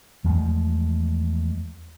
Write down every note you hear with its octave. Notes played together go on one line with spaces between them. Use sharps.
E2 F3 G#3 A3